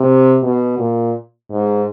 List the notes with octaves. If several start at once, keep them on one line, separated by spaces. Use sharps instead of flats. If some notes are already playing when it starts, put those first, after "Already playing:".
Already playing: C3
B2
A#2
G#2